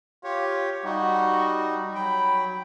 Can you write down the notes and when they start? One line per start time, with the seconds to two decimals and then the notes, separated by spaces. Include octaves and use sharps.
0.24 F4 G4 C#5
0.84 G3 D#4 F#4
1.95 F#3 G5 B5